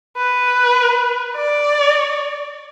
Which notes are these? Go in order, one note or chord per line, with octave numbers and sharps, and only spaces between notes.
B4
D5